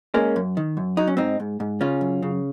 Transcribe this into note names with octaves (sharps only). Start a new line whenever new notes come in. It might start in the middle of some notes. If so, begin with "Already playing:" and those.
G#3 A#3 C#4
F#2
D#3
F#2
F#3 D#4
C#4
G#2 C4 D#4
G#2
G#2
C#3 C#4 F4
F#2
C#3